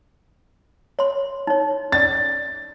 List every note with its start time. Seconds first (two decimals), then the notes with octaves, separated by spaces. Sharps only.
0.99 C#5 C6
1.47 D#4 C#5
1.92 C#4 D5 A6